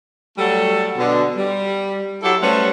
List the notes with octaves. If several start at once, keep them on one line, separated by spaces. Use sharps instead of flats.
F#3 G3 A3 A4
B2 D3
G3
F#3 E4 G4 A4
G3 A3 C#4 B4 C5 F#5